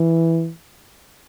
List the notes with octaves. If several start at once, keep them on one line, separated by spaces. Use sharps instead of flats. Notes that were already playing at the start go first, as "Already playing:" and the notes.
Already playing: E3